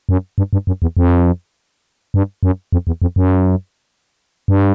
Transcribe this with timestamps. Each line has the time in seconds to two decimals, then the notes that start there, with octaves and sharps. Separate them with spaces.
0.09 F#2
0.38 G2
0.53 G2
0.67 F#2
0.82 E2
0.97 F2
2.14 G2
2.43 F#2
2.72 F2
2.87 E2
3.02 F2
3.16 F#2
4.48 G2